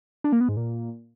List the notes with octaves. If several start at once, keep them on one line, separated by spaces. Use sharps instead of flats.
D4
A#3
B3
G#2
A#2